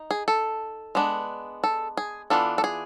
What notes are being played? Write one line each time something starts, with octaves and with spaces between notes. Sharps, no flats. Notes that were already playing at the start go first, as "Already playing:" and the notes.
Already playing: D#4
G#4
A4
G#3 B3 D4
A4
G#4
E3 G3 B3 D4 F4 A4
A4
G#4